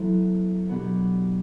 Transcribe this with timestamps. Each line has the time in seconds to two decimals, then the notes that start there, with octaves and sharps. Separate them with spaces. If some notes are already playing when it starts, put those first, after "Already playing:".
Already playing: F#3 B3 E4 A4 C5
0.69 B2 F#3 B3 D4 G4